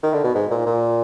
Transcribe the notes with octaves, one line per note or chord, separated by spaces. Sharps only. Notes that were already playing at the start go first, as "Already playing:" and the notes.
D#3
D3
B2
G#2
A#2
A#2